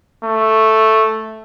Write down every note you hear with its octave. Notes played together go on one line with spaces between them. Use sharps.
A3